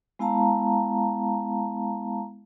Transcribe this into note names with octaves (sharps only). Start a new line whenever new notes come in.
G#3 B3 E4 F5 A5 A#5